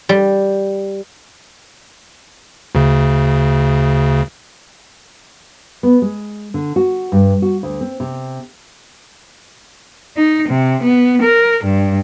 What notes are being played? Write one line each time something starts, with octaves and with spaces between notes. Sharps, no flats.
G3
D2 C#3
B3
G#3
D3
F#4
G2
F#4
D2
C4
C3
D#4
C3
B3
A#4
G2